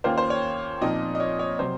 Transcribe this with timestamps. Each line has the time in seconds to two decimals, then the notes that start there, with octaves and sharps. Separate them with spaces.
0.04 D#2 D#3 A#3 C#4 F4 C5
0.18 C5
0.30 C#5
0.81 A#2 F3 C4 D#4 D#5
1.15 D#5
1.20 C#5
1.39 C#5
1.58 C3 F#3 C4 C5